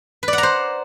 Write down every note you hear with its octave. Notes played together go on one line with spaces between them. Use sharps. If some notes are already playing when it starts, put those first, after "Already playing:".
B4
D5
F#5
A#5
C5